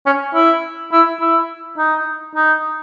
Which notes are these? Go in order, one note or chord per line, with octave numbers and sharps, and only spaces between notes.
C#4
E4
E4
E4
D#4
D#4